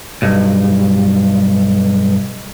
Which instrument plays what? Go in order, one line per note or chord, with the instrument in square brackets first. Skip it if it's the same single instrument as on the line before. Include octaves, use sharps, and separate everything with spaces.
[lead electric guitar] B1 G2